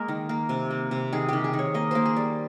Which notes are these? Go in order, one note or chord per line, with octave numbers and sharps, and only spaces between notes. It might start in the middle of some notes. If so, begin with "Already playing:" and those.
Already playing: G#3 A#3 A#4
D#3
A#3
C3
A#3
C3
D#3 G#4
D#3 G4
G#4
D#3
C#5
A#3 D#5
A#3 C5
G#4
G3